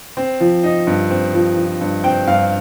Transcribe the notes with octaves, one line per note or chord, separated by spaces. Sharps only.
C4
F3
D#4
G2
C4
F3
F3
G2
C4 G5
G2 F5